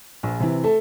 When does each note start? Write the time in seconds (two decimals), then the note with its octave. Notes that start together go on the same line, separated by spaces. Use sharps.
0.23 A#1
0.40 C3 E3
0.64 A3 A5